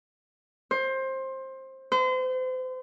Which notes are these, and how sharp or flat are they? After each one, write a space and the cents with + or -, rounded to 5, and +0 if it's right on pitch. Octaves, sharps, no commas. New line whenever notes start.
C5 +20
C5 -35